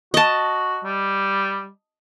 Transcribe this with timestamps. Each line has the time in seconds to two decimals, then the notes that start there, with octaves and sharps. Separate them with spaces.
0.14 F#4 D#5 A5
0.84 G3